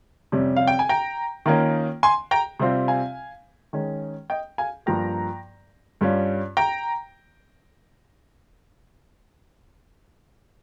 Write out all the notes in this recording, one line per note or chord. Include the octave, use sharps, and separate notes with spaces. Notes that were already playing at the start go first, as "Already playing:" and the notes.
F2 C3 G3 C#4
F5
G5
G#5
G5 A#5
D#3 A#3 C#4 F4
G#5 C6
G5 A#5
C3 G3 C4 F4
F5 G#5
D#3 G#3 C#4
D#5 G5
F5 G#5
G2 F3 A#3 G5 A#5
G2 G3 C#4 F4
G5 A#5